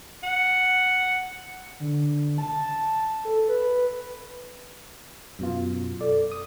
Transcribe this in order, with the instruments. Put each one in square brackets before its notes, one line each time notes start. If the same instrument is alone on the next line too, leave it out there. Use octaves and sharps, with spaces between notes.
[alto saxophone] F#5
[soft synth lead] D3
A5
A4
B4
[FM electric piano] F#2 B2 F4
[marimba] A4 [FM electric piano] D5
[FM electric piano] D#6